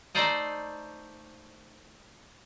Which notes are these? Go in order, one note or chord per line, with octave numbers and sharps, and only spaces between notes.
A3 D#4 C5 D5 D#5